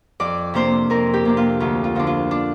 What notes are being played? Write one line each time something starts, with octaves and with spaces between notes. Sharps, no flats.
F2 D5
C3 A#3 D4 C5
F2 A#4
G4
C3 A#3 D4
F4
D2 F4
F4
D3 F3 C4 D4
F4
D4